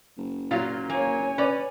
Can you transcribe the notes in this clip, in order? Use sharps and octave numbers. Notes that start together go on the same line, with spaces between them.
F#1
A#2 F#3 F4 F5
A#3 C#5 G#5
C#4 B4 D5